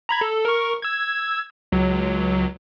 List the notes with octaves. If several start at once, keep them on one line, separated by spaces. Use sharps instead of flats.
A#5 B5 G#6
A4
A#4 C#6
E6 G#6
C#2 F#3